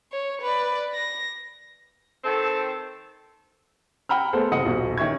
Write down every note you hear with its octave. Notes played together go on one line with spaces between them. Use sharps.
C#5
B4 D5
A#6
D#3 C4 A4
F#5 G5 A#5 B5 E6 F6
A3 B3 G#4 A4 C5
F#1 C3 D#5 F#5 D#6 C#7
D#1 B1 F#4
D#3 C#4 E5 C#6 G#6